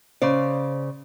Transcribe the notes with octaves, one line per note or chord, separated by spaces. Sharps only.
C#3 C5 D5